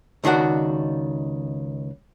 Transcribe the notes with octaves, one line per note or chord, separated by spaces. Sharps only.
C#2 D#3 D4 F#4 F#5